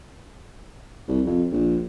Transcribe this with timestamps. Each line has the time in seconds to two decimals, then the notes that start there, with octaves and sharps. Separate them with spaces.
1.08 C2
1.25 F2
1.52 A#1